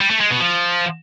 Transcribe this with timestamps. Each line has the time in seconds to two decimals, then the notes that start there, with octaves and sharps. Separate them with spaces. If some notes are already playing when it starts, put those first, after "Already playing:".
0.01 G3
0.11 A3
0.21 G#3
0.31 B2
0.41 F3